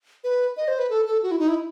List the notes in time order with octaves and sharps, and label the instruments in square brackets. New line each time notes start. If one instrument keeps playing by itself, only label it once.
[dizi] B4
D#5
C5
B4
A4
A4
F#4
E4
D#4
E4